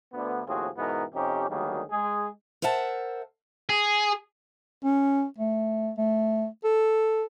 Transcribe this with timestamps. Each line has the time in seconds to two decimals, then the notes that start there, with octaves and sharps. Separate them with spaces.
0.13 D2 D3 A3 B3
0.46 D#2 A2 F3 C4 F#4 G#4
0.77 G#2 B2 E3 B3 D#4 A#4
1.14 F2 C3 C#4 D#4 G4
1.49 D2 D#3 F#3 G3 A#3 G#4
1.91 G#3 G#4
2.62 A#4 C5 E5 F#5 A5
3.69 G#4
4.84 C#4
5.38 A3
5.97 A3
6.64 A4